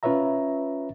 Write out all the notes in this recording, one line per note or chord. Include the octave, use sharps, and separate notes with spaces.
C#4 F4 B4 C#5 E5 A#5